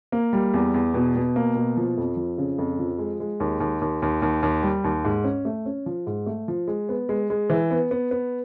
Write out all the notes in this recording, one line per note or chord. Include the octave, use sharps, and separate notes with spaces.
A#3
G3
E2
E2
B2
B2
A#3
B2
F3
F2
F3
C#3
F2
F3
G#3
G#3
D#2
D#2
D#2
D#2
D#2
D#2
G3
D#2
G#2
C#4
A3
C#4
F3
G#2
A3
F3
G#3
B3
G#3
G#3
E3
B3
B3
B3